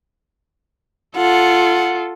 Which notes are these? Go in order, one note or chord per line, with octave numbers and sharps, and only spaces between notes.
F4 A4 F#5